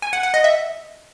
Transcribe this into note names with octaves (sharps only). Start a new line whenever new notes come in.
G#5
F#5
F#5
D#5
E5